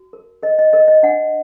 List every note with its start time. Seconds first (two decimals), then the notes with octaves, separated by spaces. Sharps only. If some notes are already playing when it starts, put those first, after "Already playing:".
Already playing: F#4
0.13 A#4
0.43 A#4 D#5
0.59 D#5
0.73 A#4 D#5
0.88 D#5
1.03 D4 F#5